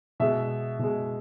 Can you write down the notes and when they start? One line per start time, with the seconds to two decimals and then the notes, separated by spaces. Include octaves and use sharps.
0.20 B2 G#3 E5
0.79 B2 G#3